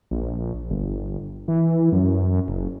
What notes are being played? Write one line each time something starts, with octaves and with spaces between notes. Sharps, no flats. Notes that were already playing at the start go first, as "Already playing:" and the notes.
A#1
G1
E3
F#2
F#1